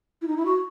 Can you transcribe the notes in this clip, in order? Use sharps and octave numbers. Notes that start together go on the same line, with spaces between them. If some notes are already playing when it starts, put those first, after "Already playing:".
E4
D#4
E4
F#4